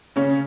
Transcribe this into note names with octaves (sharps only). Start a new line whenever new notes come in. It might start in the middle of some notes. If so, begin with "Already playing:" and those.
C#3 C#4